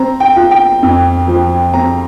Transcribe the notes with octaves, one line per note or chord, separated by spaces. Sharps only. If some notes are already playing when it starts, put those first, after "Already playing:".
Already playing: C4 A#5
G5
F4
G5
F2
F3
C4 A#5